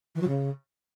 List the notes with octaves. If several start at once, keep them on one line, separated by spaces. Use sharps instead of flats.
E3
F#3
C#3